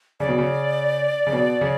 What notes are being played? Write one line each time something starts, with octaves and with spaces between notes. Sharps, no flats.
C#3 D5
B2
C#3
C#3
B2
C#3